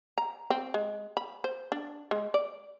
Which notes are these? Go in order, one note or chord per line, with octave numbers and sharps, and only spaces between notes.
A#5
C4
G#3
B5
C5
D4
G#3
D5